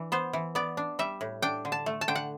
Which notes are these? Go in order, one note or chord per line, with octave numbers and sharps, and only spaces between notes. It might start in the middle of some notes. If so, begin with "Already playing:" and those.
Already playing: E3 D4
B3 C5
E3
B3 D5
D4
G3 E5
A2
D4 G5
D3
A5
A3
A5
D3 G5
F#5